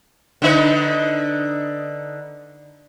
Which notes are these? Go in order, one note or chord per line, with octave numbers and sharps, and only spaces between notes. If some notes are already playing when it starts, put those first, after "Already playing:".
D3 D#4 B4